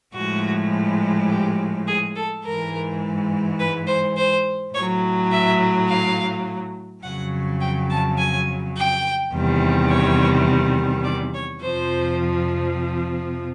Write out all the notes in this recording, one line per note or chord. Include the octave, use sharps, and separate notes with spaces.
A2 F3 G#3 F#4
G4
G#4
A4
G#2 E3 G#3 A#4
B4
C5
C5
A2 F#3 C#5
E5
F5
F2 C#3 F#3 F#5
G5
A5
G#5
G5
E2 C3 D#3 G3
C#5
D5
C#5
F2 C3 F3 C5